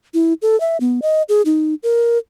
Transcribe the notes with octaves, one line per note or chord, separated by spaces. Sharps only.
E4
A4
E5
B3
D#5
G#4
D#4
A#4